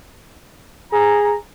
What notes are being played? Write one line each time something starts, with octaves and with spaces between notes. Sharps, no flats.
G#4 A#5